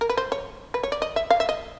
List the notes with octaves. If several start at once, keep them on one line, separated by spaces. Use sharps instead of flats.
A#4
B4
C5
C#5
B4
C#5
D5
D#5
E5
F5
E5
D#5